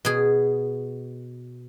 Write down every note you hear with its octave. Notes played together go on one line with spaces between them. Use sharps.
B2 G#4